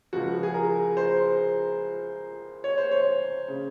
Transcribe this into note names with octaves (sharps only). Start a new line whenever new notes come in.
C#2 C#3 F3 F#4
G#4
A#4
C5
C#5
C5
C#5
C#3